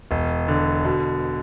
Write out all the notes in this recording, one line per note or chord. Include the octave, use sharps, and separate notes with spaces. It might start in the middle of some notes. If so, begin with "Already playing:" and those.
E1
D3
B2